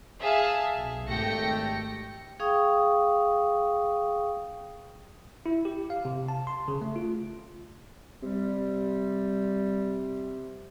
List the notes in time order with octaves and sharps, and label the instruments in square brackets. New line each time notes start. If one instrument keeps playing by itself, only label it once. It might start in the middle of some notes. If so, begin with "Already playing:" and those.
[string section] G#4 E5 F5 A5
B1
G#1 A3 G4 G5 A#6 C#7
[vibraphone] G#4 F5 G5 C#6 D#6
[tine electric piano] E4
G4
F5
C3
A5
C6
C#3
A3
F4
[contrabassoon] C3 [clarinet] G3